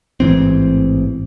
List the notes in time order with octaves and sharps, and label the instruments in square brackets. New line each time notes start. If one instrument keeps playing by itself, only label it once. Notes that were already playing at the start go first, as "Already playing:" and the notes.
[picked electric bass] A1 G#2 E3 C4